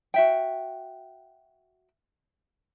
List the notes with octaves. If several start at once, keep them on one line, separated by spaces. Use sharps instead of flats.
F#4 E5 G5